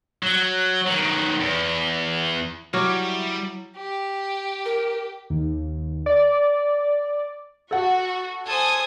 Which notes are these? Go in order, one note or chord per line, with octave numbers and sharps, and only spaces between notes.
F#3
D#3 F#3
E2
F#3 G3 E4 C#6 D6 F6
G4
A#4
D#2
D5
F#4 A4 F#5
A4 C5 G#5 D#6